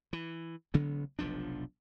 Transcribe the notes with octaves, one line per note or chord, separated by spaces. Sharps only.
E3
A1 C#3 F#3 B3
F1 B1 F3 D4